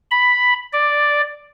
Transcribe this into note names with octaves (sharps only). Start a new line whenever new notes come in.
B5
D5